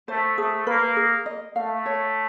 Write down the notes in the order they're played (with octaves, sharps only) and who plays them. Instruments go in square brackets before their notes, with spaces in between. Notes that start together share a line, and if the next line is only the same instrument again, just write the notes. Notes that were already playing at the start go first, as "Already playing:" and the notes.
[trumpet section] A3 [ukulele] C5
[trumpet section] A3 [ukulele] G#4
[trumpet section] A#3 [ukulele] B4
[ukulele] G#4
D#5
[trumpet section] A3 [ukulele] F5
[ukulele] C#5